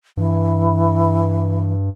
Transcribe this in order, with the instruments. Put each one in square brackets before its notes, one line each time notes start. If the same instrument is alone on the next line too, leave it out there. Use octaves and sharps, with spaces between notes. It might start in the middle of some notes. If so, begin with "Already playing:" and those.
[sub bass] G2 [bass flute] E3